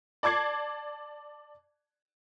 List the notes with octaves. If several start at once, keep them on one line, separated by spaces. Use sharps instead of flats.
D5 A5 D6 G#6 C7